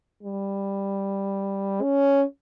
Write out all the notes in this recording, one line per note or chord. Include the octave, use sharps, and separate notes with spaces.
G3
C#4